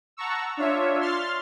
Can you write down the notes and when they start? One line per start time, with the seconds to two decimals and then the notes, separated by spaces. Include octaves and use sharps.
0.17 F#5 A5 A#5 C#6 E6
0.57 D4 F4 C#5 E5
1.00 C6 F6 A6 C7